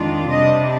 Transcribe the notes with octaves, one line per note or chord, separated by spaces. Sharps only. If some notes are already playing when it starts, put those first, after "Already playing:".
Already playing: F2 D#3 G#3 D4 F4
C3 G3 D4 D#5